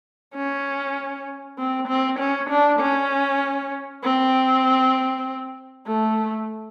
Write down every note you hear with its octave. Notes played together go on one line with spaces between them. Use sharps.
C#4
C4
C4
C#4
D4
C#4
C4
A3